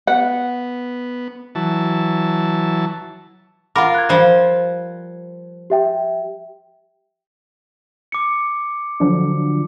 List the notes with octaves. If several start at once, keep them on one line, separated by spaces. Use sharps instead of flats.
B3 F#5
E3 F#3 A5
F4 A#4 F#5 B5 D6
F#6 G#6
F3 G3
G4 E5 G5
D6 C#7
D3 F3 F#3